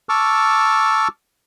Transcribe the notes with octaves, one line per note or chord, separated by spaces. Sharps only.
A5 C#6 D6 E6 F6